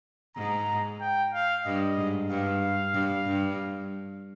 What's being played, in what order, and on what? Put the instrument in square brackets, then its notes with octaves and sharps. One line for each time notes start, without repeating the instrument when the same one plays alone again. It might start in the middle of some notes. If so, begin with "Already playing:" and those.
[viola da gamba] G#2 [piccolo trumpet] A#5
[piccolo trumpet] G5
F5
[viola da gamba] G2 [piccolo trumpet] D#5
[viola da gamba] G#2
[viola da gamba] G2 [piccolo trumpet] F5
[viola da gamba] G2
G2